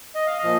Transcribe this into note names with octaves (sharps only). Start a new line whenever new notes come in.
D#5
F5
D#5
A#2 F3